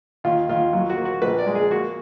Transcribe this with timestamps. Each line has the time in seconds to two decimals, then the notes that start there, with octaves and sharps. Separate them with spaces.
0.24 D#2 F4
0.49 D#2 F4
0.73 F#3 F4
0.90 F#4
0.97 A#3
1.05 F#4
1.22 A#1 B4
1.39 D5
1.46 G#3
1.55 G#4
1.71 A#3 F#4